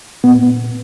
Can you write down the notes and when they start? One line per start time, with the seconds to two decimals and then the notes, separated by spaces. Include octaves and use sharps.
0.24 A#2 B3